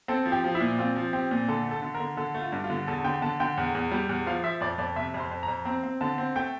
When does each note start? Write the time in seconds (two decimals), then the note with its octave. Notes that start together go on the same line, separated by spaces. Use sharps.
0.08 C4 A4
0.26 F3
0.32 G4
0.44 F3
0.55 E4
0.60 A#2
0.78 C4 F4
0.96 F3
1.13 C4 G4
1.31 A#2
1.48 D3 A4
1.65 A3
1.71 A4
1.82 D3
1.95 A#4
2.00 D3
2.17 D3 A4
2.35 A3
2.41 F4
2.52 G2
2.64 F4
2.70 D3
2.87 E2 A4
3.04 D3 G5
3.22 D3 A5
3.40 D3 G5
3.57 E2
3.75 E2
3.91 G3
4.09 E2
4.26 F3 F5
4.44 F3 E5
4.61 F2 D5
4.78 F2 D5
4.96 C3 E5
5.14 F2
5.20 C6
5.31 F2
5.43 A#5
5.48 F2
5.65 C4 A#5
5.83 C4
6.01 D3 A5
6.18 C4
6.35 A3 G5